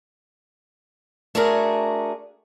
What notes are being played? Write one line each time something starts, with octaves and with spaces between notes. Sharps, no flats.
A3 D4 F#4 G#4 A#4